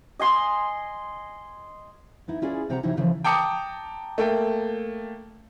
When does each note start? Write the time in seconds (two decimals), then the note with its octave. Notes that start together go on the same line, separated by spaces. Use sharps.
0.19 D#5 G#5 C6 D#6
2.28 B3 D#4 E4
2.42 C#4 E4 F4 G#4 D5 G#5
2.70 C3 C4 G4 F#5 A#5
2.83 C3 E3 F#3 D#4 E4
2.97 C#3 E3 F3 A4 C5
3.24 G5 A5 A#5 D6 D#6 C#7
4.18 A3 A#3 G5